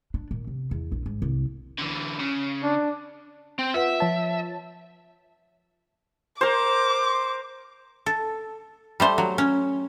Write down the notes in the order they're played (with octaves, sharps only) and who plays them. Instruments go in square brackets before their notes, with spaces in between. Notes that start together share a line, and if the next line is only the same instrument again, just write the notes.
[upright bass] D4
A#2
C3
E2
A#1
G#2
C2
[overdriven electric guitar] D3 E3
C#3
[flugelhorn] D4
[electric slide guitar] C4
[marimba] F4 B4 F#5 [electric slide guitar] E5
[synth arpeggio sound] F3 C#5 A5
[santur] A#4 C5 [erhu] D6
[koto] A4
G3 A3 C5
F#3
C#4